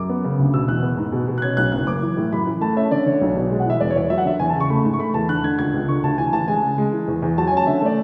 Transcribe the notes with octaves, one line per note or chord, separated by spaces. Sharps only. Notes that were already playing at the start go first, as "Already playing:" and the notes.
Already playing: F#2 D6
B3
C#3
D2
B2 E6
E2 F#6
B3
G#2
B2
B2
F#6
C#4 G#6
B1 F#6
F#1 F#6
F#1 D6
E3
A2
F#2 B5
E3
A3 A5
C#4 E5
D3 D5
D3 C#5
B1
B2
G#3
F#5
E3 E5
E1 D5
C#5
E2 D5
F#3 E5
F#5
D3 E5
E2 G#5
A5
C#3
C#6
A3 B5
G#2
C#6
A3 B5
E2 A5
D3 F#6
D3 G#6
C#2 G#6
C#2
D3 C#6
D2 A5
E3 G#5
A1 A5
G#3 G#5
C#3
G#3
E3
E2
E2
F#3 A5
G#5
C#4
A5
D3 E5
A3 D5